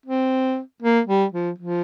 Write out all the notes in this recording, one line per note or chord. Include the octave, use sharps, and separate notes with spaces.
C4
A#3
G3
F3
F3